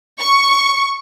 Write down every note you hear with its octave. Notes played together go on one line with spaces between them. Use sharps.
C#6